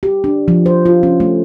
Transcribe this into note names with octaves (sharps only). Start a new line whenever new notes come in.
G4
D4
F3
C5
F4
C#4
A3